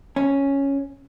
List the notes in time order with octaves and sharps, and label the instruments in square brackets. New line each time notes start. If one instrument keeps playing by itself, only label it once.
[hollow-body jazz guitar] C#4